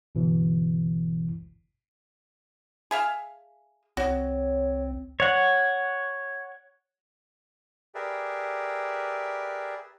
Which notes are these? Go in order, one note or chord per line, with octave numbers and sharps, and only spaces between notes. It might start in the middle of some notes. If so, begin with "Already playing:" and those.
G1 B2 E3
G#4 E5 F5
C2 C4 F#4 C#5
C#5 F#5
G4 G#4 A#4 B4 D5 E5